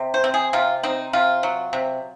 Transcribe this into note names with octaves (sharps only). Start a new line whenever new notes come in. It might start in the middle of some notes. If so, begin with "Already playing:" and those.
Already playing: C3
C5
C4
G#4
C3 F4
C4 D#4
C3 F4
F#3
C3